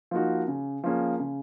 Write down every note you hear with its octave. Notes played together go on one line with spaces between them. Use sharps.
F3 A#3 D#4 F#4
C#3
F3 A#3 C#4 G#4
C#3